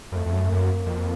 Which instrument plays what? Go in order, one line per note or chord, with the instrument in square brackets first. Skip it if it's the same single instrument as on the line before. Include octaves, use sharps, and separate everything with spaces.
[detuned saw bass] F#2
[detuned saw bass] F2 [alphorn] A3
[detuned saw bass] F2
F#2
[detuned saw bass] F#2 [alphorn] A#3
[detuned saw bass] F2